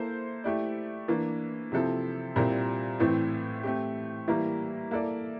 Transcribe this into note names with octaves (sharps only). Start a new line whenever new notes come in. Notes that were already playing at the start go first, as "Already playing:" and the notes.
Already playing: A#3 E4 A4 C5
A3 E4 G4 D5
E3 A#3 D4
C3 F3 C4 E4 A4
A#2 G3 C4 E4 A#4
A2 E3 A3 C4 E4
A3 C4 G4
E3 G3 A#3 E4 A#4
A#3 E4 A4 D5